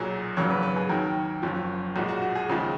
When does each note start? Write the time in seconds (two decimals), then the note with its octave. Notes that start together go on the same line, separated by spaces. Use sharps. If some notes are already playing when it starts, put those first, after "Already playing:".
Already playing: B1 A#2 F#3 G#4
0.37 G#1 F#2 C#3 F#3 A#3 C#5
0.50 B4
0.62 B4
0.76 G#4
0.89 D#2 D#3 F#3 A#4
1.42 F#1 F#2 F3
1.96 B1 A#2 G#3 F#4
2.08 F#4
2.22 F#4
2.35 G#4
2.49 D#2 C#3 F3 G#3